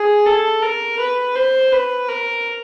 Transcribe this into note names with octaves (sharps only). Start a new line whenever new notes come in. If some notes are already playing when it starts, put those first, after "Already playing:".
Already playing: G#4
A4
A#4
B4
C5
B4
A#4